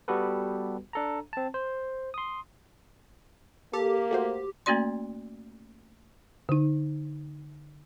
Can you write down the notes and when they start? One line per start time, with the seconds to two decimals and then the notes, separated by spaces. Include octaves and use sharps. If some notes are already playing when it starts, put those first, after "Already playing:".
0.08 G3 B3 F#4 G4 A4 B4
0.93 D4 A4 A#5
1.33 C4 A5
1.54 C5
2.14 C6 D#6
3.73 A#3 G4 A4
4.11 A3 F#4 C5
4.66 A3 A#3 C#4 F#4 D5 C6
6.49 D3 D#4